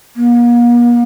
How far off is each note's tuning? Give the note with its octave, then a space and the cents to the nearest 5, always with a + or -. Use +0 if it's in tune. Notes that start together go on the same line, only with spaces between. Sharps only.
A#3 +45